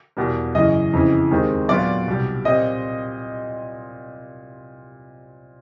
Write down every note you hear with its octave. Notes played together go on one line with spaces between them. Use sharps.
E2 B2 G3 A#3
F#2 C#3 E3 D#5
F2 C#3 E3
D#2 D#3 G#3 C4 D#4
A#2 F#3 B3 D4 F4 D5
C2 B2 G3
A#2 G3 C4 D#5